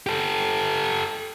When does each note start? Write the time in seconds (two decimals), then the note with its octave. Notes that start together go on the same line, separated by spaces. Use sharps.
0.07 G4 A4